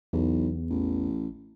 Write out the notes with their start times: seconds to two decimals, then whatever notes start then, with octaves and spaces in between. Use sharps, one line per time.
0.13 B1 E2
0.70 A1